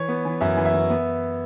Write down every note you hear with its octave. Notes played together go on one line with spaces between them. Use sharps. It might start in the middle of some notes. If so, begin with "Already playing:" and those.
Already playing: E3 C#5
B3
E3
F#2 E5
E3
E5
E3
B3